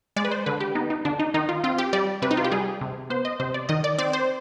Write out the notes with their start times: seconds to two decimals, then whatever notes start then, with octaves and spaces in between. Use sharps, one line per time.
0.16 G#3 D5
0.25 B4
0.31 C5
0.46 D3 B4
0.60 G4
0.75 B3 D#4
0.90 D#4
1.05 D3 D4
1.20 D#4
1.34 D#3 D#4
1.49 F4
1.64 C4 F4
1.78 G4
1.93 G3 D5
2.22 C3 B4
2.31 D#4
2.37 F4
2.44 G4
2.52 G3 G#4
2.81 C3
3.10 B3 C5
3.25 D#5
3.40 C3 C5
3.54 D5
3.69 D#3 D#5
3.84 D5
3.98 C4 D5
4.13 C5